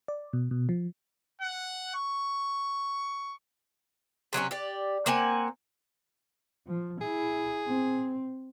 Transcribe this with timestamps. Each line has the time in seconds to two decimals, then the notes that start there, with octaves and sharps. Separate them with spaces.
0.08 D5
0.33 B2
0.51 B2
0.69 F3
1.42 F#5
1.95 C#6
4.33 C3 F#3 A#3 C#4
4.51 G4 D5
5.06 A#3 C4 F#5 G#5
6.67 F3
7.01 E4 G#4
7.68 C4